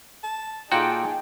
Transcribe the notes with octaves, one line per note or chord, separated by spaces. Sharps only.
A5
A#2 D#4 F4 F#4 G#4 A4 G5